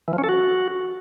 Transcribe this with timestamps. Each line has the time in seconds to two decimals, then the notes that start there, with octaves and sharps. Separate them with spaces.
0.08 E3
0.13 F3
0.18 C#4
0.24 A4
0.29 F#4